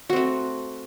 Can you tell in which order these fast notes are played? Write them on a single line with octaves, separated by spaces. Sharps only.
F#4 C4 A3